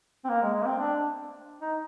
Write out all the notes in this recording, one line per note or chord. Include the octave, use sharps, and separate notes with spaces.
C4
A#3
G#3
G#3
A#3
C4
D4
D#4